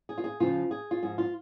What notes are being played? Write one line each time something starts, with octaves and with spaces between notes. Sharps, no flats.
G#4
F4
G#4
F2 C#3 F3 F4
G#4
F4
G#2 F3 G#4
F4